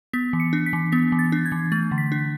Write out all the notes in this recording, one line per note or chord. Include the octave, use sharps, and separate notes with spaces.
B3 B6
E3
C#7
D4
B6
E3
B3 B6
E3
A6
D4
G#6
E3
A3 A6
D3
B6
D4